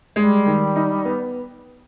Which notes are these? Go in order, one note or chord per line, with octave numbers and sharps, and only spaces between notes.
G3 G#3
D#3
D#4
B3